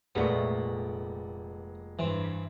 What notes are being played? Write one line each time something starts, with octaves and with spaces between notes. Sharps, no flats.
F1 A#2 G#3 A3 B3 D5
G2 E3 C4